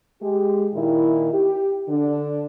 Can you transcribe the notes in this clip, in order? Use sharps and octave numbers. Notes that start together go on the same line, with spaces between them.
G#3 G4
A#2 D#3 E4
G4
D3 D4